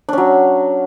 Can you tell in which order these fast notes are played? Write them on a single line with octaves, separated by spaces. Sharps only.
D4 C#4 F#3